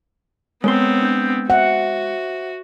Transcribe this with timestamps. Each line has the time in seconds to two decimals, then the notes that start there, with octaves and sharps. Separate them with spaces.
0.64 G#3 B3 C4 A#4 C#5 C6
1.02 D4 G6
1.50 F#4 C5 E5 F#5